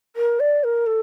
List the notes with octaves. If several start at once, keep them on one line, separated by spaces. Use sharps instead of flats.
A#4
D5
A#4
A4